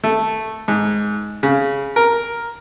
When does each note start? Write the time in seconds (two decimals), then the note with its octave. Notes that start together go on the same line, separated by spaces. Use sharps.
0.04 A3
0.68 G#2
1.43 C#3
1.96 A#4